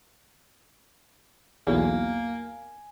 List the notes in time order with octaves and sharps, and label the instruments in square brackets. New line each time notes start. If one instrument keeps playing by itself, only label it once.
[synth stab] B1 E2 [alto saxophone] A#3 [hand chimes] G#5